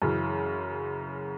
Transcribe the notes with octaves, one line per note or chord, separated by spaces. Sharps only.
F#2 C#3 E3